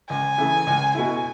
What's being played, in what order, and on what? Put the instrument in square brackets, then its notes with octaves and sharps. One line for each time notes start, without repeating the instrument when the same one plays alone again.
[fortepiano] C#2 [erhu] G#5
[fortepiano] C#3 E3 A3
C#2
B2 A3 E4